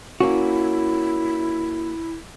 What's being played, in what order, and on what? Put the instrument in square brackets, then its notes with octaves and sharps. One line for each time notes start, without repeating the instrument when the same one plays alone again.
[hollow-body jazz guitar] A#3 C#4 F#4 [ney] E4